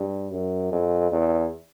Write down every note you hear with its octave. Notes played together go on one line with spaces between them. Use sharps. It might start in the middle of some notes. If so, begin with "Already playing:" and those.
Already playing: G2
F#2
F2
E2